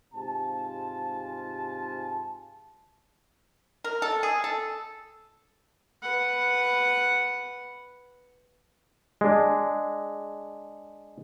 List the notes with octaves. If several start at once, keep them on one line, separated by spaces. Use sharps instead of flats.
G#2 C3 F4 G#5 A5
A#4
A4
G#4
A4
B4 F#5
G#3 D4